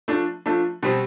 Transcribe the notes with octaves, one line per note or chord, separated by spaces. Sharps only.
F3 A3 D4
F3 A3 D4
B2 G3 C4